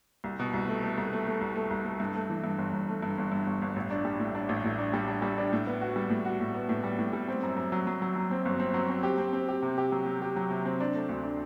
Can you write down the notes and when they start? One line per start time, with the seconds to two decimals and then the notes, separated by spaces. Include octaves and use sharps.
0.24 C2
0.39 B2
0.54 C2
0.68 A3
0.83 A3
0.98 C2
1.13 A3
1.27 A3
1.41 C2
1.56 A3
1.71 C2
1.85 A3
2.00 G2
2.15 A3
2.30 E3
2.44 G2
2.58 G1
2.73 G1
2.88 A3
3.03 G2
3.18 G1
3.32 G2
3.46 G1
3.62 G1
3.76 A1
3.90 D4
4.05 G3
4.20 A2
4.35 D4
4.49 A1
4.64 A2
4.79 D4
4.94 G3
5.08 D4
5.22 G3
5.38 D4
5.53 A2
5.67 B3
5.81 F#4
5.96 G3
6.10 A2
6.25 F#4
6.40 A2
6.54 B3
6.69 A2
6.84 G3
6.99 A2
7.13 G3
7.28 C4
7.43 F#2
7.57 F#2
7.72 F#3
7.87 F#3
8.02 F#3
8.16 F#3
8.31 C4
8.45 G1
8.60 C4
8.74 F#3
8.90 C4
9.03 G4
9.18 C4
9.33 C4
9.48 G4
9.62 C3
9.78 G4
9.92 F#3
10.06 F#3
10.22 G4
10.36 F#3
10.50 C3
10.65 C4
10.80 D4
10.94 A3
11.09 D2
11.23 D4